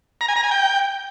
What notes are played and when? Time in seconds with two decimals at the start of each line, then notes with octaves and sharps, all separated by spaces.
0.21 A#5
0.28 G#5
0.36 A#5
0.44 G#5
0.51 G5